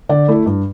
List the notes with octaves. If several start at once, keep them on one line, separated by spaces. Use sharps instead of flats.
D3 D5
A3 E4
G2